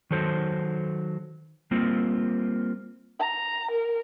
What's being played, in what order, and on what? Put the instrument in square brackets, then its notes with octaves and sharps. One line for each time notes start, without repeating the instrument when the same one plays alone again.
[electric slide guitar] D#3 F#3 A4 C5
G3 A#3 C4 F4
[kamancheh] A#5
A#4